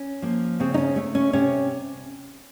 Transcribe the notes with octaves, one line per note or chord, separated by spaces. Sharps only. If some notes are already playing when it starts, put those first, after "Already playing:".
Already playing: C#4
F3 A#3
C#3 C4
D#4
C#4
A3
C#4
C3 C#4